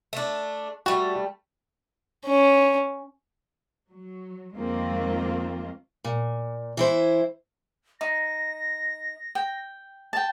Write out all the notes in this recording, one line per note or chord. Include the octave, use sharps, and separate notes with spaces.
A3 D4
G3 A3 F#4
C#4
F#3
F2 D#3 G#3 A#3 C4 F4
A#2
E3 E4 C5
D#4 A#6
G5
G5 A5